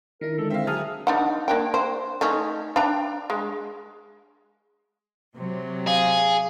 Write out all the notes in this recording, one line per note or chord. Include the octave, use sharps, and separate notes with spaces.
D#3 D4 E4 A#4
D3 G#3 A4
C4 E5 F5
F#3 G#4 A5 A#5 D#6 F6
D4 D#4 F#5
A#3 D4 G5
C5
A3 C#4 D#4
D4 G5 A#5
G#3
C3 F#3
G#4 F5